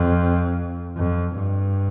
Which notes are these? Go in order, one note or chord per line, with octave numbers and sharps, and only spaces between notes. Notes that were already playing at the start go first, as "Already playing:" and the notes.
Already playing: F2
F2
G2